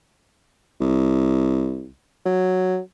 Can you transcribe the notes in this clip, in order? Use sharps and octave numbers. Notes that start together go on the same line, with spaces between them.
C2
F#3